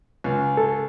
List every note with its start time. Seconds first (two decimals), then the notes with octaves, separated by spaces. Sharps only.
0.24 C#2
0.57 A4